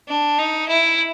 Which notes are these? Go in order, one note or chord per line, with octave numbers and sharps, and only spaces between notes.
D4
D#4
E4